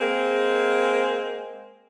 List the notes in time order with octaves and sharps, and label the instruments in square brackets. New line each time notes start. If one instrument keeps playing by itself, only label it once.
[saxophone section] G#3 A#3 C4